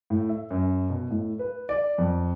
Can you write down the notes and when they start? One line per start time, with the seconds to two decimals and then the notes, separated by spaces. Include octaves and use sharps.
0.10 A2
0.29 E5
0.51 F#2
0.90 B2
1.11 A2
1.39 B4
1.69 D5
1.98 F2